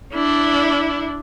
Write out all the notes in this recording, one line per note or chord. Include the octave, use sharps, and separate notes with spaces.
D4 E4